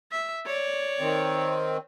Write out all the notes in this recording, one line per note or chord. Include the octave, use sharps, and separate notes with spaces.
E5
C#5 D5
D#3 C4